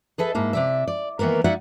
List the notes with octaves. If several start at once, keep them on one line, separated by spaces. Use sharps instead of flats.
G#4 A4 B4 E5
G#2 A#3 E4
C3 D5 E5
D5
D#3 E3 A#3 B3 A#4
A#3 D#4 F#4 D5 E5 F#5